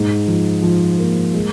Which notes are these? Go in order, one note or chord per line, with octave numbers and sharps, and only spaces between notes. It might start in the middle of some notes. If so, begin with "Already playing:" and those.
Already playing: G#2
F3
F3
A#3
G#3